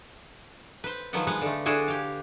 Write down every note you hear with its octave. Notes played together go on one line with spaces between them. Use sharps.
B4 C5
D#3 F3 F#3 B3 B4 F#5
G#3 B4 F5 F#5
D3 A3
D3 D4 E4 F#4 G#4 A4
G4 F5